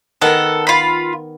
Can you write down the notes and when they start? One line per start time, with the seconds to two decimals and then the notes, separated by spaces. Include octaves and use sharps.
0.21 D#3 B3 A4 A#4 F#5
0.67 F4 B5